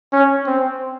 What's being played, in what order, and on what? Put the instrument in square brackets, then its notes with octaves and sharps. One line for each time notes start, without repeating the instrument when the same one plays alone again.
[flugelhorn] C#4
C4